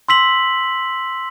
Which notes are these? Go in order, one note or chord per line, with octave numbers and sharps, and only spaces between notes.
C6 E6 B6 F#7